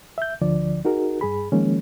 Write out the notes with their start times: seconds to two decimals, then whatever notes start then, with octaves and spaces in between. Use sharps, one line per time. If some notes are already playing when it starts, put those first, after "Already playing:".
0.18 E5 G6
0.41 D2 D3 F3 D5
0.85 D#4 F#4 G#4 A#4
1.21 G2 G#4 B5
1.52 D#3 F3 G#3 A#3 C#4